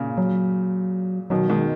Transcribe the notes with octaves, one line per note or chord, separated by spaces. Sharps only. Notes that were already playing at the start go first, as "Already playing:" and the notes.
Already playing: A#2 C#3
F#3
B2 D#3 F#3
B2 D#3 G#3